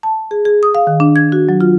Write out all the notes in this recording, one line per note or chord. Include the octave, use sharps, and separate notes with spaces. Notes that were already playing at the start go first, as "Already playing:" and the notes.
A5
G#4
G#4
D#6
F5
D#3
D4
G#6
F#4
F#3
F4